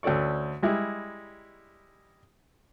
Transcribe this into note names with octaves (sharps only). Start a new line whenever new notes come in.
D2 C#4 A4 D5 C#6
G3 G#3 E4